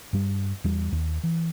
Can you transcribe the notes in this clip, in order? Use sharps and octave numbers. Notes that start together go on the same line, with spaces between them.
G2 G3
E2 G3
D#2
E3